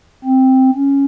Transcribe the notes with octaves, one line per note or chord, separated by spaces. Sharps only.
C4
C#4